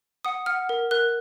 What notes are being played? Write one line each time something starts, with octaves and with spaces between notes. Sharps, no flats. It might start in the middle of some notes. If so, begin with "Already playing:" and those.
F#5 D#6
F#5 F6
A#4
A#4 F#6